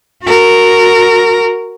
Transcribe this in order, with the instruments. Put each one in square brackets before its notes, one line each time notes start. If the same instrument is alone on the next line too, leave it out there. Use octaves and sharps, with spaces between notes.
[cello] F#4 A#4